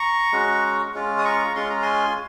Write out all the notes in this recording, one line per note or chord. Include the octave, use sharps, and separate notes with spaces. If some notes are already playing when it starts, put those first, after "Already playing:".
Already playing: A#5 C#6
G#3 C#4 F#4
G#3 C#4 F4
D#6
A#5 C#6
G#3 C#4 F4 C6
A#5
G#5 C6